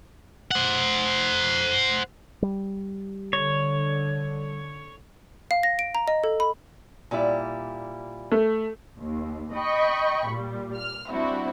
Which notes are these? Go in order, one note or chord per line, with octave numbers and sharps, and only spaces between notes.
C5 F#5
G3
D3 C#5
F5
A#6
D7
A#5
D#5
A4
B5
A#2 G3 E4
A3
D#2
D#5 G5 B5 C#6
A#2 G3
F6
G3 C4 D4 E4 F#4